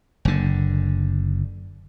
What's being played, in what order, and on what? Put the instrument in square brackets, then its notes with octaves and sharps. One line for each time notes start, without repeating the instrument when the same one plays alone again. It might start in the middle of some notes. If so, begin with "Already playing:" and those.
[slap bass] F#1 D3